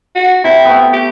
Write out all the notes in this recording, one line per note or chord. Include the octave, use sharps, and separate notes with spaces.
F#4
C3 E4
A3 B3
G4